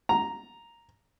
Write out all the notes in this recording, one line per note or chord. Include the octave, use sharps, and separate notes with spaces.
A#5